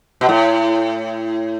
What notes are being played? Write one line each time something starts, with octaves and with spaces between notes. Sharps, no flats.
B2
A2